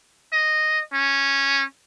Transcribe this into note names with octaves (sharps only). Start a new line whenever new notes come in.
D#5
C#4